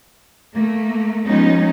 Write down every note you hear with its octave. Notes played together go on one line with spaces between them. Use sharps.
A3 A#3
F3 G3 G#3 B3 C#4 D#4